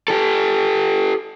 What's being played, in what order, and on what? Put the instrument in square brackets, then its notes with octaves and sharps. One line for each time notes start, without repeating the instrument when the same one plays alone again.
[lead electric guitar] G4 A4